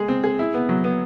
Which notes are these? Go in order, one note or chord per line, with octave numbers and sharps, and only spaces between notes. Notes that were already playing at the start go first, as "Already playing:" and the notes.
Already playing: G#3 G#4
C4
G#4
E4
B3
F#3
B3